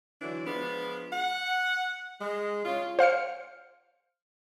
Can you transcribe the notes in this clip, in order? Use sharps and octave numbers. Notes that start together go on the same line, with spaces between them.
D3 E3 F#3 D4
F3 G#3 B3 D4
F#5
G#3
C#3 F4
C5 F5 F6 C#7